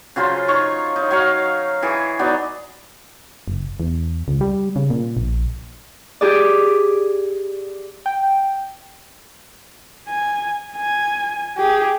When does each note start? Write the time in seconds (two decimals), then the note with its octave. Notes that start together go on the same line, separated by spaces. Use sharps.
0.16 C#3 F#3 F4 C5
0.48 D#4 C#5 C#6
0.96 D#4
1.11 F#3 C#5 F5
1.83 E3 G#4
2.19 F#3 B3 D#4 D5
3.48 F#1
3.80 E2
4.28 C#2
4.41 G3
4.76 C#3
4.90 A#2
5.17 A#1
6.21 G4 G#4 D5
8.06 G5
10.09 G#5
10.76 G#5
11.58 G4 G#4